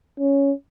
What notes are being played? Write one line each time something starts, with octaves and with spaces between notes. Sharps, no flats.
C#4